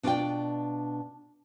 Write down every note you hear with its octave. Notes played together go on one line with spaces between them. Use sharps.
B2 D4 F4 B4 D5 G5